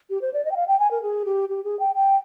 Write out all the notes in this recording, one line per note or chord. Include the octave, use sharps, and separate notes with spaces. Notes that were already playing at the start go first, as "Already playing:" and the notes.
G4
C5
D5
D#5
G5
F5
G5
G#5
A#4
G#4
G4
G4
G#4
G5
G5